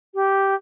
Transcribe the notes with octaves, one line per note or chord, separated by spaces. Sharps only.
G4